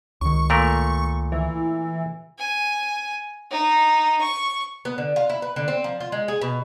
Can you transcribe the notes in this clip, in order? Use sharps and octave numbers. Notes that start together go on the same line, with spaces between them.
C#2 D#3 C#6
A#2 A3 A#4
E3
G#5
D#4
C#6
B3
D3
F4
E4
B4
D3
C4
F3
F4
G#3
G#4
B2